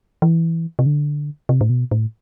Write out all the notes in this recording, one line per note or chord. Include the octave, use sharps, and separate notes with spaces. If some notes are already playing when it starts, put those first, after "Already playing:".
E3
C3
D3
C3
A2
B2
A2